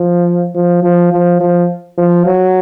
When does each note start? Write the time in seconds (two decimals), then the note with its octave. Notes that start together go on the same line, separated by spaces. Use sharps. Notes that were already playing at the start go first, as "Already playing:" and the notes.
Already playing: F3
0.55 F3
0.83 F3
1.12 F3
1.40 F3
1.98 F3
2.26 F#3